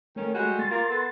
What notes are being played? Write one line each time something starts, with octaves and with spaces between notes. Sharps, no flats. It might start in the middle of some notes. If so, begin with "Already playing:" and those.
D#3 A3 C#4
G3 G#3 F#4
C6 A6
A#3 F4
B3 A4